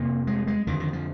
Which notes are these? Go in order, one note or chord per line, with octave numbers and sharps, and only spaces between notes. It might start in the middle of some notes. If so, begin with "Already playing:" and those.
Already playing: F2 C3 A#3
G#3
G#3
F2 D3 D#3
D#3
F3